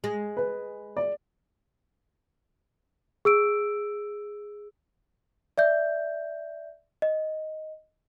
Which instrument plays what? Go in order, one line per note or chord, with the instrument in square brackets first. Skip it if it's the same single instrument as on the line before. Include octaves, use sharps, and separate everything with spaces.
[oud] G#3
[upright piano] B4
D5
[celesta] G#4 E6 D7
D5 E5 G6
D#5